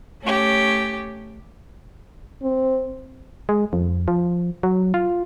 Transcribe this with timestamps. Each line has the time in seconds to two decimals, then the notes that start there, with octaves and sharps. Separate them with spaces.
0.22 A3 C#4 G4
2.42 C4
3.49 G#3
3.73 F2
4.08 F3
4.63 F#3
4.94 F4